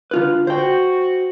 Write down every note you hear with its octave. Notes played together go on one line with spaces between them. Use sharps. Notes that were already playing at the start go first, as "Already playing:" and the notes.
D3 F4 B4
F#4 C5 G5